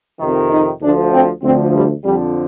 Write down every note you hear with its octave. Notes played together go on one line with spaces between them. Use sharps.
F2 C3 D#3
D#4
D2 D3 F3 D4
C4
D2 D3 F3 C4
G3
F2 D3 F3 G3